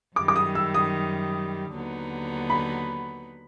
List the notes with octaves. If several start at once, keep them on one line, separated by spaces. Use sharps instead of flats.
F#2 D#3 G3 D6
D6
D#6
E6
D#6
D#2 D3 F#3 B3 D#4
B5